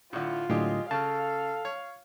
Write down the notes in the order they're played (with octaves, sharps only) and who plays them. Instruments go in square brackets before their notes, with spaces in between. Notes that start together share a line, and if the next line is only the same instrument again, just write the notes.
[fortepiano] A2 D3 [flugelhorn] E4 [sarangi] F4
[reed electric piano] A2 D3 F#3 [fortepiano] G#3 G4 [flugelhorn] D#5
[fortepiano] C#3 [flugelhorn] A4 [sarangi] F5 [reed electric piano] A5
[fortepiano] C#5